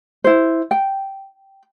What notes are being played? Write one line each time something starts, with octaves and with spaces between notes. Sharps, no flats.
E4 C5
G5